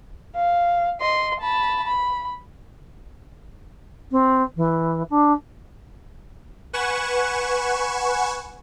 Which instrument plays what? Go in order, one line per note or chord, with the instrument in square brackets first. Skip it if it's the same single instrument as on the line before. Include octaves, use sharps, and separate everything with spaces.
[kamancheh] F5
D#5 C6
A5 B5
B5
[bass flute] C4
E3
D4
[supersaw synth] B4 F#5 G#5 C#6 E7